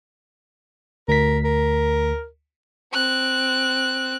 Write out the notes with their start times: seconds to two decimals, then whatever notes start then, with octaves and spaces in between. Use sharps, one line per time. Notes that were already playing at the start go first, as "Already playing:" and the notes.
1.08 D2 A#4 B6
1.44 A#4
2.93 C4 F#6